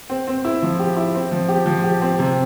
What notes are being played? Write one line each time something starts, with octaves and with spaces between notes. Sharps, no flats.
C4
C4
E4
F3
G4
E4
C4
F3
G4
F3
G4
C4
C3